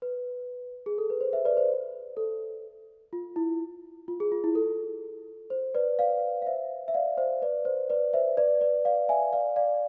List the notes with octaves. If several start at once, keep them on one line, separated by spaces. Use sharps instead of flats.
B4
G#4
A4
B4
C5
C5 E5
B4 D5
C5
A4
F4
E4
F4
G#4
F4
E4
A4
C5
B4 D5
D5 F5
F5
C5 E5
E5
D5 F5
C5 E5
B4 D5
C5
B4 D5
C5 E5
B4 D5
B4 D5
D5 F5
E5 G#5
D5 F5
D5 F5